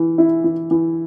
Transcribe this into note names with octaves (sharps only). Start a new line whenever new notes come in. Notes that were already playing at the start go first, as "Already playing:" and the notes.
Already playing: E3
E4
E3
E3